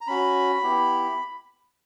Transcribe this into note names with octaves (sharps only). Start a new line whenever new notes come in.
A#5
C#4 F#4 B5
B3 E4 G4